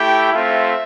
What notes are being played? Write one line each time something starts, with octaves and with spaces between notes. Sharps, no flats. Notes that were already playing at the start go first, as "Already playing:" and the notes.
Already playing: A3 E4 G4 G5
A3 C4 F4 E5